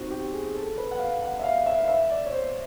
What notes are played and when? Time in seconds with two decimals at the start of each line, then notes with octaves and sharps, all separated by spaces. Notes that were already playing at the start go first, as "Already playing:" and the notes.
Already playing: C4 D#4 F#4
0.11 G4
0.33 G#4
0.55 A4
0.77 B4
0.91 F#5
0.99 F5
1.22 F#5
1.39 E5
1.43 F5
1.66 E5
1.78 F5
1.88 E5
2.10 D5
2.26 C#5
2.32 C5